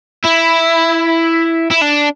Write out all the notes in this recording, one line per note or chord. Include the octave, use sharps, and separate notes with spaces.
E4
E4
D4